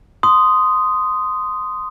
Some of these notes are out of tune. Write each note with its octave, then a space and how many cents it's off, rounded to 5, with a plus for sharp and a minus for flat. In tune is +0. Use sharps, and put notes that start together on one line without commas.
C6 -10 D#6 +0